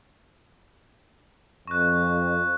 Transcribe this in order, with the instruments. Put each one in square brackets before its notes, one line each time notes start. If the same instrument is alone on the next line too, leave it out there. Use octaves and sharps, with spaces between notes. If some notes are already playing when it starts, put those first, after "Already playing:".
[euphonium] F2 [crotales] C#6 F#6